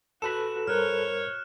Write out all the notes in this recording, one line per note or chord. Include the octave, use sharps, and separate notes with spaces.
F#4 A4 B4 B5 E7
G2 A#4 C5 C#5 F6 F#6